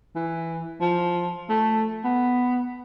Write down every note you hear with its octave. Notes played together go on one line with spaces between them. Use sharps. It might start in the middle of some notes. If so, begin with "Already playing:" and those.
E3
F3
A3
B3